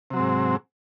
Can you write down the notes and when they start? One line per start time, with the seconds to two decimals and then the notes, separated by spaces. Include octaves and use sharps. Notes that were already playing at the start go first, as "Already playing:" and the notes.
0.10 C3
0.13 F#3
0.16 C4
0.20 G#2